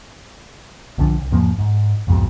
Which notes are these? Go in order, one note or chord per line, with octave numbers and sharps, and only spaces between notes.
B1 D3 F3 D4
C2
E2 G#2 F3 A#3
G#2
C2 F2 G#2 B2